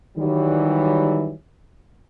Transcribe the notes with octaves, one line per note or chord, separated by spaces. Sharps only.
D#3 E3 F#3 G3